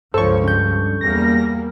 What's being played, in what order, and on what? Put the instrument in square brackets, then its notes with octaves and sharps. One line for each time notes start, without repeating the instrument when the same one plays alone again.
[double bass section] C#2 F3 [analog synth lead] G2 [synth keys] A4 C#6 [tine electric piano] C5 C#5
[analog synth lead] G2 [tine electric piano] C#4 G6
[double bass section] E2 G3 A#3 [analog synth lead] A#6